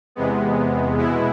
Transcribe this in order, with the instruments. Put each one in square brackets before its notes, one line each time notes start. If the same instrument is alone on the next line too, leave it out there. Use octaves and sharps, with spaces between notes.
[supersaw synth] E2 C3 G#3 B3
B2 G#3 B3 E4